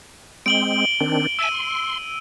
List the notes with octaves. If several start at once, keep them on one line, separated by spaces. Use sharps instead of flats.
G#3 C4 D7 F#7 G7
D#3 C4 D4
E5 G#5 A5 E6 D#7
C6